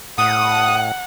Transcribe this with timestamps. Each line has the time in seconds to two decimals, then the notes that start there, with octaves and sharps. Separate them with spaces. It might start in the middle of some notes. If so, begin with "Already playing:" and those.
0.18 A2 F#5 D#6